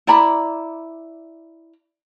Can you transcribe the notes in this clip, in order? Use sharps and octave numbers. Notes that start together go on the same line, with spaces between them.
E4 D5 A#5 B5